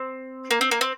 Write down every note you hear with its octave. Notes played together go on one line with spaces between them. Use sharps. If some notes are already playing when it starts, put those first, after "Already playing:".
Already playing: C4
A#3
C4
A#3
C4